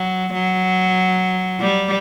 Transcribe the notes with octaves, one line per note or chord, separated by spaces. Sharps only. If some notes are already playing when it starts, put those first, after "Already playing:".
Already playing: F#3
F#3
G3